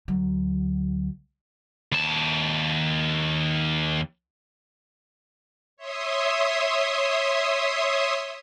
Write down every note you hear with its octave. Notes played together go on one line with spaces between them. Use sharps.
D2 F#3
D#2 A5
C#5 E5 C6 D#6